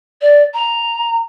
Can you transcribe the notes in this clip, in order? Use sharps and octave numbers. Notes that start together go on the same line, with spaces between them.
D5
A#5